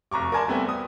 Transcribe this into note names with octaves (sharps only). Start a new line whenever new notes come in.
F1 A#5 C#6 D6
A#4 D5 G#5 A5 C6
G3 A3 B3 C4
D#6